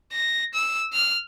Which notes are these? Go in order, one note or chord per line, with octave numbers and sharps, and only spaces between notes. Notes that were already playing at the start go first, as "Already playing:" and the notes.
A#6
E6
F6